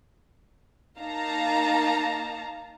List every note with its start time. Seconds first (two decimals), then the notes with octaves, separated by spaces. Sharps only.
0.98 A#3 D#4 F5 A5 A#5